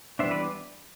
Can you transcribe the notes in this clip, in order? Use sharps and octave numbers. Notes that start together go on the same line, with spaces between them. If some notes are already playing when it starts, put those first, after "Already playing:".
E3 G3 B3 D4 C5 E5
B4 D5